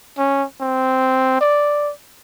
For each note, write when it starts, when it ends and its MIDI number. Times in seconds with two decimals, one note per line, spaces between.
0.18 0.44 61
0.61 1.36 60
1.41 1.92 74